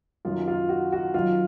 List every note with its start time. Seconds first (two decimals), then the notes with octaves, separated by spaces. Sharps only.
0.25 F#2 D#3 F#3 F4
0.48 F4
0.69 F#4
0.92 F#4
1.14 F#2 D#3 F#3 F4